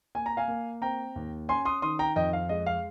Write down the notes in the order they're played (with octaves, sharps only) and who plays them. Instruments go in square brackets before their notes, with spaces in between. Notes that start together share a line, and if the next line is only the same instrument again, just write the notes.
[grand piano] A#3 G#5
A#5
F5 G#5
A#3
C4 G5 A#5
D#2
C#4 G#5 C6
C6 D#6
D#3 C6 D#6
G5 A#5
F2 D#5 G5
F5
G#3 D#5
F5